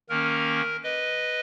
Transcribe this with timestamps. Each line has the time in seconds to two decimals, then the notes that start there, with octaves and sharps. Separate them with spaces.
0.09 D#3 A#3 C#4 A#4
0.84 B4 D#5